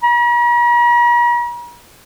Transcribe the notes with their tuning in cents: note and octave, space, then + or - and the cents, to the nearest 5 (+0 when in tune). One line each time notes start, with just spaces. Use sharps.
A#5 +45